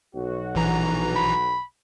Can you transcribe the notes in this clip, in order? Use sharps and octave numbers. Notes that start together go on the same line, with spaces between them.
B1 F#4
A#1 E3 A#5
B5